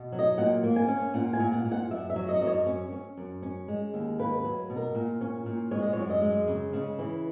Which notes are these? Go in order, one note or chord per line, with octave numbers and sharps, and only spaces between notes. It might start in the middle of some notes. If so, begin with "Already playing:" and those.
Already playing: B2
F#3
D#5
A#2 F#5
A#3
G#5
C#4
A#2 F#5
G#5
A#2
F#5
A#2
F#5
F#2 E5
E5
F#3
D#5
F#2 D#5
C#5
C#4
C#4
F#2
C#4
G#3
D#2
A#3 B4
B4
F#3
B2
A#4
A#2
C#4
A#2
G#3 C#5
D#5
F#2 C#5
D#5
G#3
C#3
C#3
E3